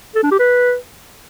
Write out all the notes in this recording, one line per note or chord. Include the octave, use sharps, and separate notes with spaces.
A4
D4
G4
B4